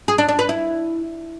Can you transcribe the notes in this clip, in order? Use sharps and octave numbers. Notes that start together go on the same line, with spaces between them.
G#4
D4
D4
B4
E4